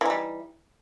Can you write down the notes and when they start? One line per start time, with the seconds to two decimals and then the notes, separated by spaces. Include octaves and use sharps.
0.01 E3
0.05 D#4
0.10 G3